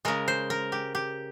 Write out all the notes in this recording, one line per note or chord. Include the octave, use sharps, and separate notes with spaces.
C#3 G#3 A#4
C5
A#4
G4
G4